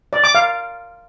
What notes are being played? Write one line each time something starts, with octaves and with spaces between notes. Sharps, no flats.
D5
D6
F5